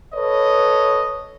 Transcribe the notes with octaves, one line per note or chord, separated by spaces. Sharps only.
A4 B4 C#5 D#5